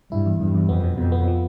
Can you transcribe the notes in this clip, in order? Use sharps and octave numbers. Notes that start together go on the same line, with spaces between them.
G2 E4
E2
E2 G2
E2
F2 B3
B2
F2 B2
B3
F3